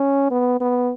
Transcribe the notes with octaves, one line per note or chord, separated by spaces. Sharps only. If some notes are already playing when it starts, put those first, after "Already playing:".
Already playing: C#4
B3
B3